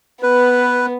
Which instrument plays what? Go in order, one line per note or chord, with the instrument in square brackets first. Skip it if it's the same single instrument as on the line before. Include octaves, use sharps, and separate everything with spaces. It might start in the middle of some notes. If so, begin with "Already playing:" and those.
[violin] B3 [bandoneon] B4